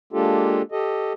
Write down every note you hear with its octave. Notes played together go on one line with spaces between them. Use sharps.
G#3 A#3 D4 F4 G4 A4
G4 A4 D#5